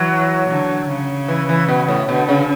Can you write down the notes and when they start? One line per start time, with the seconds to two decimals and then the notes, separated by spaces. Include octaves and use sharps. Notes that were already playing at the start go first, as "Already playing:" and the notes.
Already playing: E3 F#3
0.49 D3
0.89 C#3
1.28 E3
1.49 E3
1.68 B2
1.88 A2
2.08 B2 D3
2.29 C#3